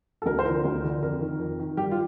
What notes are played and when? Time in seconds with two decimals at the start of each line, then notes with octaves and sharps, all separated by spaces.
0.22 A4
0.26 D2 A#4
0.39 C5
0.45 D3 F3 A#4
0.65 D2
0.83 D3 F3
1.02 F2 A#4
1.21 D#3
1.39 F2
1.59 D#3
1.77 G2 G4
1.91 F4